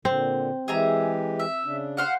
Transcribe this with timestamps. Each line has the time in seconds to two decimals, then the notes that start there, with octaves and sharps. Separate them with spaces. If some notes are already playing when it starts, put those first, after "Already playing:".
0.05 A#2 D3 C4
0.68 E3 G#3 G4 G#4 E5 A#5
1.40 E5
1.65 C#3 D4
1.97 C5 F5 F#5